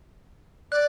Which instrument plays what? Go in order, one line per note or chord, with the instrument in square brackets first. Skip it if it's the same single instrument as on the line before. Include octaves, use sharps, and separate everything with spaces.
[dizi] D5 [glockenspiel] F#6